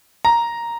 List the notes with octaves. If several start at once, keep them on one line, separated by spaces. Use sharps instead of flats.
A#5